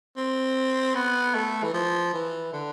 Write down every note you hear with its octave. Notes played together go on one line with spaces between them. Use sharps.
C4
B3
A3
E3
F3
E3
D3